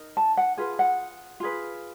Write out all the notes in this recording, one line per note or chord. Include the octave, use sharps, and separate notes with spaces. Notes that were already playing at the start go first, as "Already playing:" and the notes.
Already playing: D#4 A#4
A5
F#5
F4 G#4 B4
F#5
F4 G#4 B4